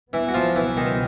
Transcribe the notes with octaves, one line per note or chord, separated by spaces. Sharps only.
C#2 B2 E3 F#3 B3 E4
F#4
F3 F4
E3 E4
D#3 D#4